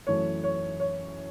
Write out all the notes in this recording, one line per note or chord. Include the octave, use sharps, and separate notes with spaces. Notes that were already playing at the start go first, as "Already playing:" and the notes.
F#2 E3 A3 C#5
C#5
C#5